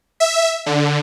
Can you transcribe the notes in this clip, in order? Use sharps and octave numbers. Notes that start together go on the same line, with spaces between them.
E5
D3